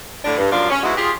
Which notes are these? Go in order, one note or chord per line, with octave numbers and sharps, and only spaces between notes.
A2 D3 D4
G2
F#2 F3 F#3 D4 F4 F5
C#4
G#2 B2 G#3 E4 F#4
F4 G4 G#4